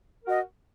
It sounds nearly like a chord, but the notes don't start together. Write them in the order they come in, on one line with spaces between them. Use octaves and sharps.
A#4 F#4 D#5